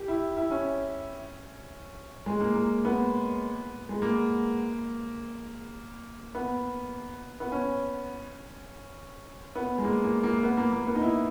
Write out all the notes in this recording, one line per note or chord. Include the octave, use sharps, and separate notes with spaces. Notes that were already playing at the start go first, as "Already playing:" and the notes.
Already playing: G4
E4
E4
C#4
G#3
A#3
A#3
B3
G#3
A#3
B3
B3
C#4
B3
G#3
A#3
A#3
A#3
B3
A#3
A#3
B3
D#4
E4